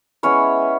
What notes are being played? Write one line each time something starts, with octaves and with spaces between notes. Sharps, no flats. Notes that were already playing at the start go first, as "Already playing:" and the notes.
G#3 B3 C#4 E4 C#5